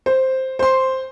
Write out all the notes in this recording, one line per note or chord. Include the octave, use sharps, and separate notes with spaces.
C5
C5 C6